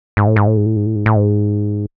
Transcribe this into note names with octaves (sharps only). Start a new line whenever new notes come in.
G#2
A2
G#2
A2
G#2
A2
G#2
A2
G#2
A2
G#2